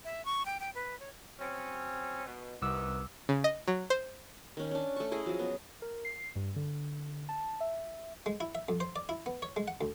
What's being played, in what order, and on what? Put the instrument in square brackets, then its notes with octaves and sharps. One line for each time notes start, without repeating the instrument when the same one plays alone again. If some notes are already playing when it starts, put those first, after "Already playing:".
[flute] E5
C#6
G5
G5
B4
C#5
[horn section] F#3 C4 C#4
B2
[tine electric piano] C2 D6 E6 [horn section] C3 D#3 B3
[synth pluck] C#3
D#5
F#3
C5
[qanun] D#3 C#4
C#4 D4
A3 C#6
E4 G#4 D#5
F3 F#3
B3
[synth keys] A#4
C7
G2
D3
A5
E5
[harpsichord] G#3
E4
E5
F2
C5
D5
E4
B3
C#5
G#3
F#5
D2